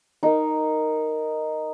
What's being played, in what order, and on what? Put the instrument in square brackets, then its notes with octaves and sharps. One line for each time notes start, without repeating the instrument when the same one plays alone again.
[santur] D#4 A#4